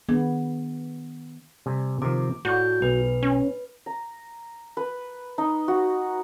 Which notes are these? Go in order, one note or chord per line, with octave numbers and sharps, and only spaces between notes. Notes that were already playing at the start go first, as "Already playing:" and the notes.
D#3 B3 D4 G#4
C3 G3 G#5
C3 D#3 F3 D6
A2 F#4 C#5 D5 G6
B1 B4
C#4
A#5
B4
D#4
F#4